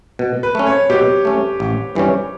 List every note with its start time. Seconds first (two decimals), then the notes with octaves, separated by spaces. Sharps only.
0.19 B2
0.43 B4
0.55 A3 C#4
0.66 C#5
0.90 B2 G4
1.25 A3 C#4
1.60 A1
1.95 G2 E3 G3 C#4